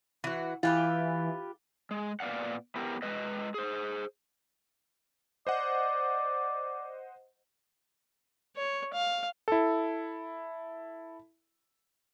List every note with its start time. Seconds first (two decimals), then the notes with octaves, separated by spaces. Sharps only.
0.24 E3 F#4
0.63 E3 F4 G4 B4
1.91 G#3
2.20 A#2 B3 D5 F5 F#5
2.76 B3 E4 G4 A#4
3.02 G#3 B4 D#5
3.54 G#4 C5
5.47 C5 D5 D#5 F#5
8.56 C#5
8.93 F5
9.48 E4 A4